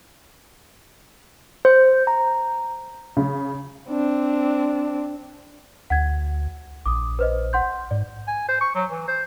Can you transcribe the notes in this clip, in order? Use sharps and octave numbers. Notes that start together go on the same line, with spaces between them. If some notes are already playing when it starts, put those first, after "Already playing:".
C5
A#5
C#3
C4 D4
D2 F#5 G#6
A#1 D6 D#6
B4 C5 D#5
F#5 C6 G6
G#2 D5
G#5
C5
C#6
F#3
E3
C5